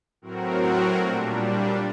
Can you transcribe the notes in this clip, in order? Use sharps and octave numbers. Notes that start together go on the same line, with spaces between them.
A2 F#3 C4 F#4 A#4
A#2 G3 D4